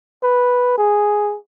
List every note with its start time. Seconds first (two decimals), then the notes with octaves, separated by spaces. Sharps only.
0.23 B4
0.78 G#4